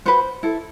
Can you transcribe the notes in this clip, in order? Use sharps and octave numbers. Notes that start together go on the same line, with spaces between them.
F#4 B4 C5
E4 A4